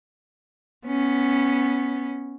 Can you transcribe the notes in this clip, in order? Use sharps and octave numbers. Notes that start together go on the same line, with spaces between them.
B3 C#4